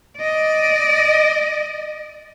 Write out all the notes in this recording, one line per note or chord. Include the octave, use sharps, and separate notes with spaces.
D5 D#5